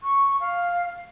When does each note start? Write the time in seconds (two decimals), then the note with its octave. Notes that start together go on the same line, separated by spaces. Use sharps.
0.03 C#6
0.40 F5